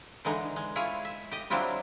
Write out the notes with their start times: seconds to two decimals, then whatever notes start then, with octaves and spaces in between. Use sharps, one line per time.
0.25 D3 E3 G#3 D#4
0.56 G#3
0.76 E4 F4 G#4 C#5
1.05 E5
1.31 G4 D#5
1.50 F#3 G3 C4 D4 E4 F4